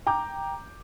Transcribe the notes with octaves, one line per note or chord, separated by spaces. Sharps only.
G5 A#5 D6 G6